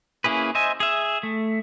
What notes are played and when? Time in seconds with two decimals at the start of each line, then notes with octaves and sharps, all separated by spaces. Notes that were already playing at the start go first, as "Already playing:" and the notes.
0.24 A#3 C#4 E4 G#4 B4
0.55 C5 D#5 E5 G#5
0.80 G#4 E5
1.23 A3